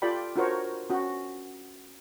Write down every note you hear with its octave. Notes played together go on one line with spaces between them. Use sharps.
F4 G4 A4 D5 G5 B5
D4 F4 F#4 A#4 C5 C#5
C#4 F#4